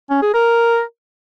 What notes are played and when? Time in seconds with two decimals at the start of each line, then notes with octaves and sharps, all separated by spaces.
0.10 C#4
0.22 G#4
0.34 A#4